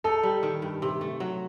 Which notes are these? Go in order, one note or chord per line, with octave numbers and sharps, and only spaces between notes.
D#4 A4
G3
D#3
G2
C3
A3
F#3